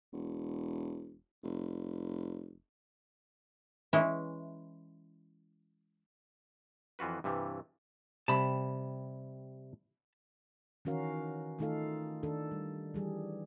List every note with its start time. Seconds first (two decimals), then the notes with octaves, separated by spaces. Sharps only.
0.13 E1
1.43 F1
3.93 E3 G#3 C#4 E4
6.99 F2 E3 F4 F#4 B4
7.24 G2 C3 E3 G3
8.28 C3 G3 A5 B5
10.85 D#3 E3 C#4 F#4 A#4 F5
11.59 D#3 A3 D#4 F4 A4 F5
12.23 D#3 D4 A4
12.51 G3
12.94 E3 G3 G#4